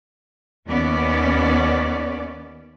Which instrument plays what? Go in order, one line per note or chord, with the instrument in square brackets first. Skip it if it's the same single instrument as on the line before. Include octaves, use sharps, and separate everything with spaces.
[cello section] D#2 B3 C#4 D5